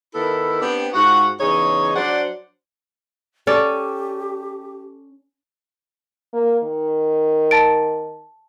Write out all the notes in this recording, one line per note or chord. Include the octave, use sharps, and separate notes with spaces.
D#3 B3 E4 A4
B3 C4 D4 G4
G#2 F4 F#4 F#5
E2 C#3 D#4 G#4 C#5
F#3 D4 C5 D5 F#5
C#4 G4 A4 D5
A#3
D#3
A5 A6 D7